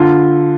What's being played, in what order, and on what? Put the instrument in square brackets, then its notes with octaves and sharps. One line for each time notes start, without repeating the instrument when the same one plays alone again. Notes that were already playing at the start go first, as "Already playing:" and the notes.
Already playing: [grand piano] D3 F4